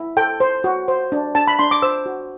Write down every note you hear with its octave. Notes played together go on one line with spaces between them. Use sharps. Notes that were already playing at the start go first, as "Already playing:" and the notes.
Already playing: E4
A4 G5
C5
F#4
C5
D4
D4 A5
B5
D4 C6
D6
C5 E6
F#4